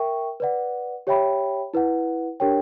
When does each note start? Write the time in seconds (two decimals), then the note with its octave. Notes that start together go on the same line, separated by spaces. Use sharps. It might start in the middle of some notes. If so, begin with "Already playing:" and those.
Already playing: A#4 E5 G5 C#6
0.40 B4 D5 F#5
1.07 G4 C#5 E5 G5 B5
1.74 E4 B4 F#5
2.40 D4 G4 A#4 C#5 G5